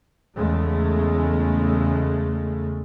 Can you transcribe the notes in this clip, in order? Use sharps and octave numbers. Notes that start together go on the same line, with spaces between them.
E2 C#3 G#3 A3